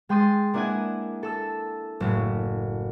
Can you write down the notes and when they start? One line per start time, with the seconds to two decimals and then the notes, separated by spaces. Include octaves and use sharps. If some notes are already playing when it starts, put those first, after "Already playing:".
0.09 G#3 G5 C6 D#6 A6
0.54 A#3 D4 E4 D#5 F#5 G#5
1.23 A4 E6
2.00 F#1 A2